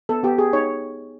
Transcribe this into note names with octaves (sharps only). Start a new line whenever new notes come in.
B3 A4
B3 G4
G4 G#4
D#4 C#5